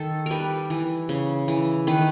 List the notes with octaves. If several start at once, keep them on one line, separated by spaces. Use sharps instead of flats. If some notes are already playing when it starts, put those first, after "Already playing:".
Already playing: D#3 A4
G3 A#4 B4
E3
C#3
E3
D#3 B4